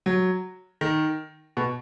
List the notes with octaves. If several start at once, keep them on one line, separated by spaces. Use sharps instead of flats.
F#3
D#3
B2